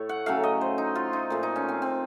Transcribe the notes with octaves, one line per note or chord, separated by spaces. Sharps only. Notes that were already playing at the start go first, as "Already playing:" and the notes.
Already playing: A2 A3 C#5
F#5
C#3 F#3 A3 F5
D#5
C5
D#4
F4
D#4
A#2 F3 A3
D#4
C#4
C4
C4